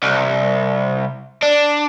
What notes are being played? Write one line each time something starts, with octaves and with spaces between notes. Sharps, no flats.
C2
D4